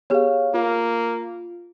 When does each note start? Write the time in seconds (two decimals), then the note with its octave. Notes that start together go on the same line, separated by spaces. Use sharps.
0.10 B3 G4 G#4 C#5 F5
0.54 A#3 F4